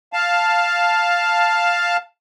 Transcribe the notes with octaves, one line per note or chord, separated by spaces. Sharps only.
F5 A5